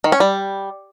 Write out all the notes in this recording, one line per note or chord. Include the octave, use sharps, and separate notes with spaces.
D#3
C#4
G3